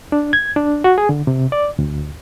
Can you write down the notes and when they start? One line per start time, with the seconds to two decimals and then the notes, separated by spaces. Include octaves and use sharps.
0.12 D4
0.33 G#6
0.56 D4
0.84 F#4
0.98 G#4
1.09 D3
1.27 C3
1.52 D5
1.79 D2